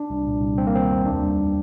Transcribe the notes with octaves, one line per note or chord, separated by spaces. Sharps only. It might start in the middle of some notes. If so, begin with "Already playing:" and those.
Already playing: D4
C2
A#2
C2
G3 C4
A#3
D#3 C4
F2
D#2 D4
G3